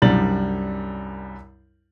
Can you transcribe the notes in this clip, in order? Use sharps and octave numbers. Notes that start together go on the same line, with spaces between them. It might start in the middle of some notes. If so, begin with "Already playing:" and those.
C2 F#2 G3 D4 A6 F#7